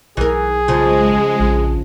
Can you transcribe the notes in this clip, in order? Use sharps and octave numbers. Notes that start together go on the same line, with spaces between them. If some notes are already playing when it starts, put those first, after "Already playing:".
B1 E3 G#4 A#4
C#3 F3 G#3
A#1